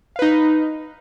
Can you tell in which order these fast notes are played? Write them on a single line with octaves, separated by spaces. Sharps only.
F5 B4 D#4